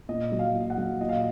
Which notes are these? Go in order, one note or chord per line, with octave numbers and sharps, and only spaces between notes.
A#2 D#5
F#3
F5
A#2
F#5
F#3
A#2 D#5
F5